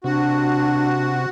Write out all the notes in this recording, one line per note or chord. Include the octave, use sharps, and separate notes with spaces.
C3 D4 F#4